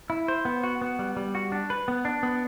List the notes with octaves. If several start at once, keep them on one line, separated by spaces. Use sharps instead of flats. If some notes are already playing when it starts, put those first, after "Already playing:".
E4
C5
B3
F#4
B3
G3
G3
F#4
D4
B4
B3
D4
B3